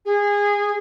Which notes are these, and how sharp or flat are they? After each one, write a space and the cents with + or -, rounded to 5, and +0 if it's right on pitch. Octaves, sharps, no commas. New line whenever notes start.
G#4 -25